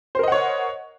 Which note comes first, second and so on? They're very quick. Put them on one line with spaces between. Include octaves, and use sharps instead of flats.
C5 A#4 D#5 F#5 C#5